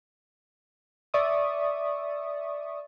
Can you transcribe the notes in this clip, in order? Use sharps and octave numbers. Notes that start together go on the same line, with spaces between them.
D5 E5 C#6 D#6